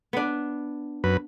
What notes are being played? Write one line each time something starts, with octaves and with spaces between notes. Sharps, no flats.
B3 D4
F#2 B4